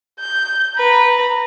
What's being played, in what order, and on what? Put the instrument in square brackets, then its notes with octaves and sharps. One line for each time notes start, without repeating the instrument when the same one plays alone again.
[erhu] G6
[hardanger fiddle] B4 [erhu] A#5